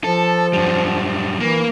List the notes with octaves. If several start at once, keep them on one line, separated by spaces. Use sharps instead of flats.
F3 A4
F#2 G3
E3 A#3